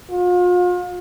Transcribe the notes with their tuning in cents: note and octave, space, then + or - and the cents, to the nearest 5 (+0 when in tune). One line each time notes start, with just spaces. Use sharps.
F4 +40